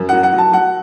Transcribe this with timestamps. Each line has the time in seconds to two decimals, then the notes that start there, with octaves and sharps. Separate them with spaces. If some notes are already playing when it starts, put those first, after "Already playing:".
Already playing: F#2
0.09 F#3 F#5
0.23 F#5
0.33 F#3
0.38 A5
0.52 F#3 F#5